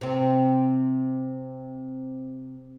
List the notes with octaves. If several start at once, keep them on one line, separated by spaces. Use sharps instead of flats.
C3 C4